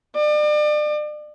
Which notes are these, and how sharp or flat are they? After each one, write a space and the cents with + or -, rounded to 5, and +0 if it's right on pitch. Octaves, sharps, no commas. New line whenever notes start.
D5 +35